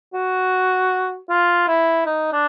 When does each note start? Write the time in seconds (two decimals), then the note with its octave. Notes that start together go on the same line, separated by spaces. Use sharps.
0.14 F#4
1.30 F4
1.68 E4
2.06 D#4
2.32 D4